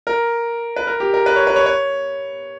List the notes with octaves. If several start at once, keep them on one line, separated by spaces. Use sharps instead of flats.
A#4
B4
A#4
G4
A#4
B4
C#5
B4
C#5
C#5